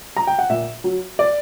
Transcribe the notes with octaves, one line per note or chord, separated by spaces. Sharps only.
A#5
G5
F#5
A#2 E5
F#3
D5